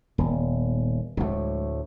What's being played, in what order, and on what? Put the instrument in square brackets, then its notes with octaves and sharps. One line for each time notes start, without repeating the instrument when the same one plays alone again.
[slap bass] D#1 [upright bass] A#2 B3
[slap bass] D2 A2 [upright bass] F3 G#3